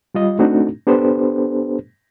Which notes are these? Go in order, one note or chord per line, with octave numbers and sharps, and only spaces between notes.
G3 F4 D#5
A3 C4 D4 D#4 F#4 A4
B3 D4 G4 A4 B4 C5